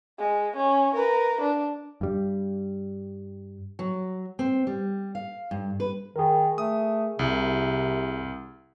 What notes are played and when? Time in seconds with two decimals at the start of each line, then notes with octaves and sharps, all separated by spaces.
0.18 G#3
0.56 C#4
0.94 A#4 B4
1.41 D4
2.01 G2 G3
3.79 F#3
4.39 C4
4.67 G3
5.15 F5
5.51 G2
5.80 B4
6.16 D#3 G#4 A#4
6.58 A3 D#6
7.19 C2 C3